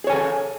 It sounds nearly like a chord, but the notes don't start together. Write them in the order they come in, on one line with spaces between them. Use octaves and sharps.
G#4 C#5 G#5 A4